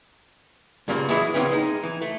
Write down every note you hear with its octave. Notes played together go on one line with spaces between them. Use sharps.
G2 A#2 C#3 A#3
E3 F#3 G#3 E4 G#4
A#2 C#3 E3 G3 B3 C4
G#3 D#4
E3
A3